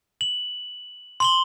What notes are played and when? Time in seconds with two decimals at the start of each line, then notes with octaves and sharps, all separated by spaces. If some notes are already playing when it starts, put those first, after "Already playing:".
0.21 F#7
1.20 C6 F#7 G7